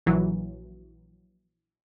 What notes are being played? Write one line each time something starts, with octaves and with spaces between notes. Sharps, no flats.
A#1 E3 F#3